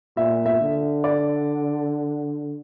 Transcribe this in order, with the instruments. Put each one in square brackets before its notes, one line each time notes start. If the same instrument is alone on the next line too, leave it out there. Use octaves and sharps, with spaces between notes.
[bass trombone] A#2 [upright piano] E5
[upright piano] E5
[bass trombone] D3
[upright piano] D5